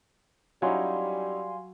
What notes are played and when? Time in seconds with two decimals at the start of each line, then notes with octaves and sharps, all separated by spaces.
0.62 F#3 G3 C#4 D#4 E4 F5 G#5 C6